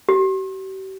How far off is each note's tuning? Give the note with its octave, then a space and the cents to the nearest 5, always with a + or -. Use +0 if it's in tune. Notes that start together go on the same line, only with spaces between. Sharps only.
G4 -45